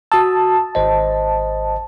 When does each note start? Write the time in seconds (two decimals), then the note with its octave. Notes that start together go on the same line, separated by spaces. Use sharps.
0.12 F#4 A5 D#6 E6
0.75 G#1 C5 D#5